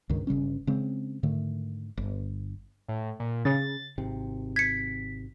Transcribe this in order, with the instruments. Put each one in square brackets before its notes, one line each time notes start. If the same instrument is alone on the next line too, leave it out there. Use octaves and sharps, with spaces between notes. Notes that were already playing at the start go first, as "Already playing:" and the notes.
[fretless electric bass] C#2 G2 D#3
G1 C#3 G3 C#4
C#3 G#3 C4
G#2 D3 D#3 A3
G1
[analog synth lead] A2
A#2
[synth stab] C#3 [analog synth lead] A6
[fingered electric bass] G#1 C3 C4
[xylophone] G#6 C#7 [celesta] B6